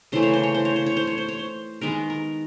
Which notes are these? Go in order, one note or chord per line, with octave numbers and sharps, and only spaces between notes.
C#3 E3 A3 C5
C#5
C5
C#5
C5
C#5
C5
C#5
C5
C#5
C5
C#5
C5
D#3 G#3 B3 A#4
A#4